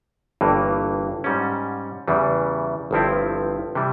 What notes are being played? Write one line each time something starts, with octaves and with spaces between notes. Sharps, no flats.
G1 G2 E3 A#3
G#2 G3 C#4
E2 C#3 E3 G3
G1 G2 F3 C4 E4
C3 E3 G3